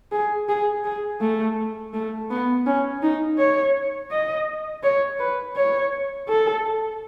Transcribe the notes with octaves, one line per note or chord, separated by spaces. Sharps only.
G#4
G#4
G#4
A3
A3
B3
C#4
D#4
C#5
D#5
C#5
B4
C#5
A4